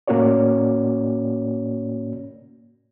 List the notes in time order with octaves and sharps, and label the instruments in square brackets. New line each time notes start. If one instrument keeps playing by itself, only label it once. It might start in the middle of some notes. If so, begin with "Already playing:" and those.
[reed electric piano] A2 A#3 C#4 F#4 C#5 D5